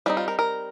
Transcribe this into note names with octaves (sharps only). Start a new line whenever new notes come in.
G3 C4 D#4 F4
F4
A#4
A#4